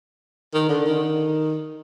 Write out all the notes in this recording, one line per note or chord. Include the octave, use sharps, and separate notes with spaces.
D#3
D3
D#3